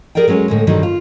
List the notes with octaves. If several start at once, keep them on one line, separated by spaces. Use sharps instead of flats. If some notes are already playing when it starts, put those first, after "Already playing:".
G4 G#4 A#4 D5 F5 G5
F#3 G#3 C#4 G#4
A2 D3 G#3
G2 B2 D3 D#3 F#3 G3
F4